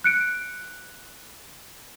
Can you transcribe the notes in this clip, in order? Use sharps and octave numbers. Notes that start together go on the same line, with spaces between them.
F#6 C#7 D7